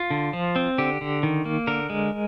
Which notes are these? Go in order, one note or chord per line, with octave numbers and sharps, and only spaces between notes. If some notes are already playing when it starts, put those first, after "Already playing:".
Already playing: F4
D3
F3
C4
D3 G4
D3
D#3
A#3
D3 A#4
G#3